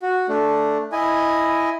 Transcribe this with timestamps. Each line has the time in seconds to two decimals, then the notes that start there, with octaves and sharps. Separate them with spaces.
0.02 F#4
0.29 A3 D4
0.92 E4 D#5 G#5